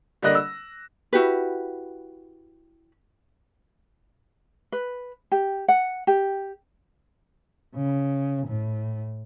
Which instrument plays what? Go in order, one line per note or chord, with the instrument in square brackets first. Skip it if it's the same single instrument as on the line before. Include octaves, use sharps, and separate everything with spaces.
[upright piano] D3 G3 A#3 D#5 F#6 A#6
E6
[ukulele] E4 F#4 G4 B4
B4
G4
F#5
G4
[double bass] C#3
A2